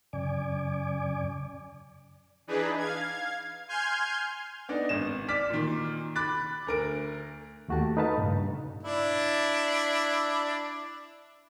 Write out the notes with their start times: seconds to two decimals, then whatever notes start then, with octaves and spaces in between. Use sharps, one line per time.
0.13 F#2 C#3 D5 G#5 D6
2.47 E3 D4 D#4 G#4 B4
2.78 F5 G#6
3.68 G#5 C6 F6 G6 G#6
4.69 B3 D4 D#4
4.89 G#1 E7
5.28 D5 D6 F6 B6
5.50 A#2 D#3
6.16 B5 D6 F#6 A6
6.67 D2 A#4 D7
7.68 D#2 A3 F#4 G4 A5
7.97 D#4 A4 B4 F5 A5
8.18 G2 A#2 C#3
8.83 D4 E4